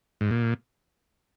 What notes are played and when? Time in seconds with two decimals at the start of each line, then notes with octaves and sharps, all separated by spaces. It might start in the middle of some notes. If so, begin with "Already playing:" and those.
0.21 G#2
0.31 A#2